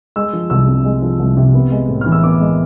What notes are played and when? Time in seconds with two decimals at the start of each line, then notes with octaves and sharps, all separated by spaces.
0.16 G#3 E6
0.33 F3
0.50 C2 E6
0.68 C3
0.85 G#3
1.02 F3
1.20 C2
1.37 C3
1.54 B3
1.71 G#3
1.89 A2
2.01 E3 F6
2.12 E6
2.24 B3 D6
2.41 G#3